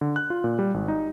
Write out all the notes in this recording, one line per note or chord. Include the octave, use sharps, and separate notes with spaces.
D3
F#6
F4
A#2
G3
G#1
D#4